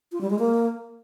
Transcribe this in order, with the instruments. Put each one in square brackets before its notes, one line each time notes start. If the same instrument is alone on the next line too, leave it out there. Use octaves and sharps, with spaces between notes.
[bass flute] F4
G3
G#3
A#3